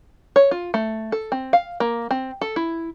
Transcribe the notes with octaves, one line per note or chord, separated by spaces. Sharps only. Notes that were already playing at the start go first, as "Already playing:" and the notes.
C#5
F4
A3
A4
C4
F5
A#3
C4
A4
E4